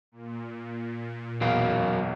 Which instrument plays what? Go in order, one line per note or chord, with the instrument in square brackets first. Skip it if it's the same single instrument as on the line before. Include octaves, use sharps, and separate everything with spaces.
[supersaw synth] A#2
[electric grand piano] B1 E2 [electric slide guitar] F#3 A#4 F5